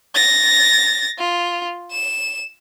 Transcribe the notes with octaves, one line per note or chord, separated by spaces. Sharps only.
A6 A#6
F4
E7